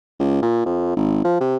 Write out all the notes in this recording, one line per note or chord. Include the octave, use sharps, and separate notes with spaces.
C#2
A#2
F2
G#1
F3
C3